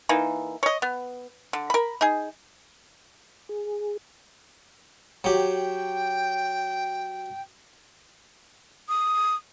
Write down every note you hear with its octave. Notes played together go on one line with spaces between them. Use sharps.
E3 A#3 D#4
C#5 D#5
B3
D3
A#4 B5
D#4 G#4
G#4
F#3 G4 G5
D#6